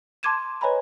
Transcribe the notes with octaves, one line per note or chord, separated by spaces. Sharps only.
A5 C6 D6 G#6 D#7 E7
B4 C#5 D#5 G#5 A#5 B5